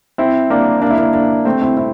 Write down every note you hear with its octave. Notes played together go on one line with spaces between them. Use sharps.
C4 E4
A#3 D4
A#3 D4
E4
A#3 D4
A#3 D4
A3 C4
C4 E4
C4 E4